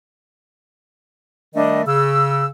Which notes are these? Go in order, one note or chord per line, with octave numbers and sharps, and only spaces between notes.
D#3 G3 A3 D4 D#5
C#3 E6